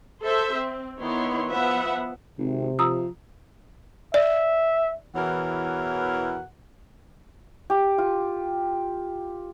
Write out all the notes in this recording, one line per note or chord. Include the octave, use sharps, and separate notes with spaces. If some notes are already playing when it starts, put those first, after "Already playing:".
A4 C5 E5
C4
D#3 B3 E4 C#5 C6
F3 B3 B4 E5 F#5
G#1 C3
F3 A#5 D#6 E6
D5 E5
E2 B2 E3 A#4 C#5 F#5
G4
F4